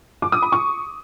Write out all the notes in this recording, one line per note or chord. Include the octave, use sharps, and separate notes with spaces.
D6
D#6
B5
C#6